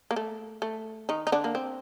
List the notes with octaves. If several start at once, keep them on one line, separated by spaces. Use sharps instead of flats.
A#3
A3
A3
D#3 D#4
D#4
D3 D4
A#3
C4